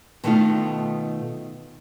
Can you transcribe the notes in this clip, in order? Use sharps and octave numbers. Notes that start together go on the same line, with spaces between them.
B2 D#3 A3 B3 D#4 F4